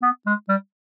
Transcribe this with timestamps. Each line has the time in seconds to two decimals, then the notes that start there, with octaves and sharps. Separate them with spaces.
0.02 B3
0.26 G#3
0.49 G3